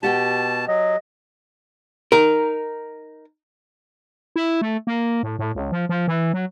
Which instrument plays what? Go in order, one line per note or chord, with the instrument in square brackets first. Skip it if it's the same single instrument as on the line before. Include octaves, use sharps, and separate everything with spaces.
[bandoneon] B2 A5 [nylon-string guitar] G4 F#5 G5
[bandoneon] F#3 [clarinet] D#5
[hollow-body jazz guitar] D#4 A#4
[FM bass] E4
A3
A#3
A2
A2
C#2
F3
F3
E3
F#3